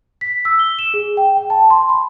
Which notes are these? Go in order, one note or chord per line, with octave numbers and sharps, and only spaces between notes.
B6
E6
G7
E7
G#4
G5
G5
A5
C6
B5